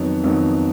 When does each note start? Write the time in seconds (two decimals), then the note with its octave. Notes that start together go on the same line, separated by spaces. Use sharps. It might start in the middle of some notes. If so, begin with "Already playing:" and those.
Already playing: F2 D#3 F#3 B3
0.24 F2 D#3 F#3 B3